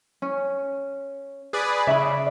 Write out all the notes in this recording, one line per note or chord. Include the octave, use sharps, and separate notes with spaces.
C#4
G#4 B4 D5
C#3 D5 E5 B5